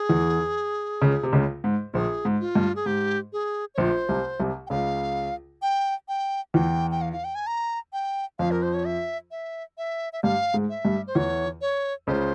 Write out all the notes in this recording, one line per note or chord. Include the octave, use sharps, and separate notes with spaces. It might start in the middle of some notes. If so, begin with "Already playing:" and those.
Already playing: G#4
E2 E3
C#2 C#3
C3
C#2 C#3
G#2
A#1 A#2 G#4
G#2
F4
G2
G#4
G#2 G4
G#4
C#5
A#1 A#2 C5
C2 C3
C2 C3
G5
C#2 C#3 F5
G5
G5
E2 E3 G5
G5
F5
F5
G5
G#5
A#5
G5
F2 F3 F5
A#4
C5
C#5
E5
E5
E5
E5
G2 G3 F5
G#2 G#3
E5
G2 G3
C5
E2 E3 C#5
C#5
C#2 C#3 C5